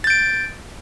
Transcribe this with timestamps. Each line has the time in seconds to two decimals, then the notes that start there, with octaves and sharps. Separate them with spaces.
0.04 A6
0.07 G6
0.10 D7